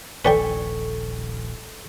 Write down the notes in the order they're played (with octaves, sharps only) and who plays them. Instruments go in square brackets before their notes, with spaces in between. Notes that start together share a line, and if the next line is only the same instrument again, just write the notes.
[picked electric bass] D#1 A#1 [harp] A4 G#5 C#6 [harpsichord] B4 D5 G5